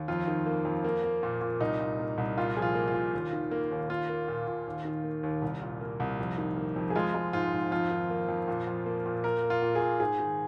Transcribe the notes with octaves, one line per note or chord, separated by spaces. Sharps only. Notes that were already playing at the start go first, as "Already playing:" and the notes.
Already playing: D#2
F2 F4
D#3
A#3
F2
A#3
A#3
A#2
A#2
C2 D#4
A#2
A#3
C2
A#2 F4
F3 G#4
F4
A#3
F4
A#2
D#2
D#3
A#3
D#2
A#3 F4
A#3
A#2
A#2
D#2
D#3
A#3
D#2
C2
A#2
A#3
C2
F2
D#3
A#3
F2
G#4
G#3 F4
G#3
G#2 F4
G#2
F2 F4
D#3
A#3
F2
A#2
F3
A#3
A#2
A#3 A#4
A#3
F4
A#2
G#4
A#2
G#2 G#4
D#3